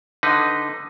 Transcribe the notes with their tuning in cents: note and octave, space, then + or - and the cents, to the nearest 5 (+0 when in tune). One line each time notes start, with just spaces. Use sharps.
D3 +10 D#4 +0 B4 +0